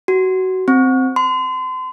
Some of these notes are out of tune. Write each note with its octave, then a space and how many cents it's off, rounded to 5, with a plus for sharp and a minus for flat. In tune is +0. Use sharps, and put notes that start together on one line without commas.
F#4 +20
C4 -5
C6 -35